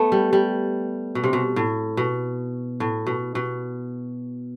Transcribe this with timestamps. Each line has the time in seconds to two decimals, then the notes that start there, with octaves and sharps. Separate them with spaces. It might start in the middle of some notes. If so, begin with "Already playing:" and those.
Already playing: A3 B3
0.12 G3
0.33 G3
1.15 B2
1.24 C3
1.33 B2
1.56 A2
1.97 B2
2.80 A2
3.07 B2
3.35 B2